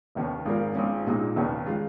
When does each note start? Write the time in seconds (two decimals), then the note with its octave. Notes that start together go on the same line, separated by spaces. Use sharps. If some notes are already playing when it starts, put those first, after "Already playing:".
0.15 F1 D#2 D#3 C#4
0.45 G#1 G#2 F3 C#4 A#4
0.75 G#1 G#2 F3 C#4
1.07 A#1 A#2 G#3 D#4
1.36 F1 D#2 D#3 C#4
1.66 F3 G#3 F4